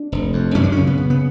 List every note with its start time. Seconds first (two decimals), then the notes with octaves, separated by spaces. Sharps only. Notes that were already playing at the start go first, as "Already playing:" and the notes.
Already playing: D4
0.12 F1
0.33 F2
0.55 F#2 C#4
0.63 D4
0.72 C#3 C#4
0.87 B3
0.98 C#3
1.10 B3